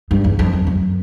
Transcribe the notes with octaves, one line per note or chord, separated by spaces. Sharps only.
G2
E2
F2
F#2
F#2